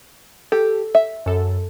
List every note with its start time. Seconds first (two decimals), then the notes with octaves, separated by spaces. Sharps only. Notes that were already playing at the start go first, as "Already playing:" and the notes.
0.52 G4 A4
0.95 E5
1.26 F#2 A4